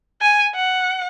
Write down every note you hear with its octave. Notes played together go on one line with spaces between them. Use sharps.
G#5
F#5